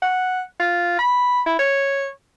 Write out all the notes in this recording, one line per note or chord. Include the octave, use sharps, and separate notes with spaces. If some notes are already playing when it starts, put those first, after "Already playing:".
F#5
F4
B5
E4
C#5